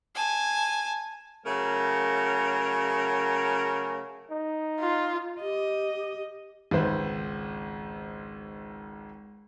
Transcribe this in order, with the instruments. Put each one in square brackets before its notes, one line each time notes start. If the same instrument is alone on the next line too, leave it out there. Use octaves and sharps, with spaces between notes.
[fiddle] G#5 A5
[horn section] C#3 F#3 A3 A#4
[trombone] D#4
[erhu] F4
[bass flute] G4 [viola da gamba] D#5
[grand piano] G#1 C#2 B4 C5